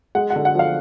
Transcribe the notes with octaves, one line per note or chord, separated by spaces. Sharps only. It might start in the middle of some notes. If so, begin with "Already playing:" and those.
G#3 F#5
F#5
D3
F#5
F3 F5